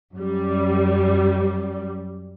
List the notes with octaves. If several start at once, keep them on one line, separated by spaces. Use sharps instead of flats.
F#2 G3